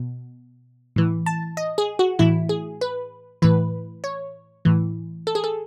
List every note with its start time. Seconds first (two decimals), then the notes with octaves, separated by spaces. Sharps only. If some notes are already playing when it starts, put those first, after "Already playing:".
Already playing: B2
0.96 A2 E3
1.26 A5
1.57 D#5
1.78 G#4
1.99 F#4
2.19 A2 E3 E4
2.49 G#4
2.81 B4
3.42 A2 E3 B4
4.04 C#5
4.65 A2 E3
5.27 A4
5.35 G#4
5.44 A4